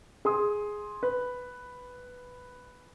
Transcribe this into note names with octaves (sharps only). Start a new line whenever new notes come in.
G#4 C6 D#6
B4